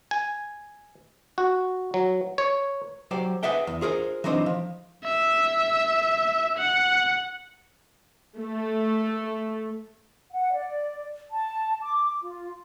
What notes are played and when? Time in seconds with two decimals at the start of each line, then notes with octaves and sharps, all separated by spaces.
0.11 G#5
1.38 F#4
1.94 F#3
2.38 C#5
3.11 F#3 G4 C5 D5
3.43 G#4 B4 D5 E5 F#5 G5
3.67 E2
3.81 F4 G#4 A#4 C5
4.24 E3 F#3 C4 D4 D#4 C5
4.46 F3
5.04 E5
6.58 F#5
8.38 A3
10.31 F#5
10.54 D5
11.31 A5
11.82 D6
12.22 F4